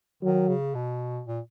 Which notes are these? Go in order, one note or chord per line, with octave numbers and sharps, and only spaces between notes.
D#3 F#3
C#3
B2
A#2